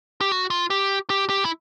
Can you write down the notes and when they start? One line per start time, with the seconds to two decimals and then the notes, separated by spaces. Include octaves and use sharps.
0.21 G4
0.32 F#4
0.50 F4
0.70 G4
1.10 G4
1.30 G4
1.45 E4